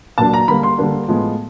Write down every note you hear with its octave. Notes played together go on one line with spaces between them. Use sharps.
A#2 F#3 A#3 D4 A5
A#5
D3 G3 A#3 B5
C6
D3 G3 A#3 D4
A2 F3 G#3 B3